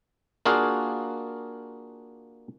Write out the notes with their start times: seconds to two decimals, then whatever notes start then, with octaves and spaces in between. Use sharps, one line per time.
0.45 A#3 D4 F4 F#4 G#4 F5